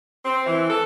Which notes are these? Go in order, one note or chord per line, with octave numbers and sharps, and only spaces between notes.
C4
E3
A4